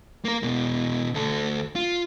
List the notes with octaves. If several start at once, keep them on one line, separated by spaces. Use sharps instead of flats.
A#3 A#4
B2 G#3
D2 A4
F4